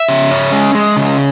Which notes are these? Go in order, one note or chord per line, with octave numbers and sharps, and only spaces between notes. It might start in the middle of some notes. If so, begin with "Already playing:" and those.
Already playing: E5
C#3
C#4
G#3
G#3
C#3